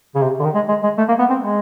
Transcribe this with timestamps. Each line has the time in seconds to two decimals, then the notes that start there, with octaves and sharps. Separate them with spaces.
0.15 C#3
0.22 C3
0.39 D3
0.44 D#3
0.54 G#3
0.69 G#3
0.83 G#3
0.98 A3
1.08 A#3
1.19 B3
1.30 C4
1.40 G#3